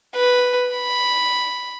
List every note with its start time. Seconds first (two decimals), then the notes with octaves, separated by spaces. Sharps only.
0.16 B4
0.69 B5